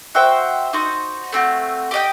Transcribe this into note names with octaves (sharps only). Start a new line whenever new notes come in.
F#4 C5 E5 G5
D#4 F#4 C5
A3 C4 F#4
G4 D#5 G5